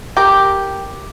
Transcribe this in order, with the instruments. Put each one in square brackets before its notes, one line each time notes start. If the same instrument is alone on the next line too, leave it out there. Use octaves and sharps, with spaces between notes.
[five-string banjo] G4 A#4